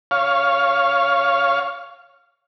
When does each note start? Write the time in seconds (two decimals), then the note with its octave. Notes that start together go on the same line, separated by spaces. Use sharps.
0.11 C#5 F5